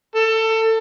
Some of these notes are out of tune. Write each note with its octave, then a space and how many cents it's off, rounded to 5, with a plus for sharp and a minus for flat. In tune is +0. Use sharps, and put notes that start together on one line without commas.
A4 +25